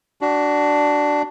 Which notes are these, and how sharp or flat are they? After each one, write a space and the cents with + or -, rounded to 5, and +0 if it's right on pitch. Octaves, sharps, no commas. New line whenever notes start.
D4 +0 F#4 +25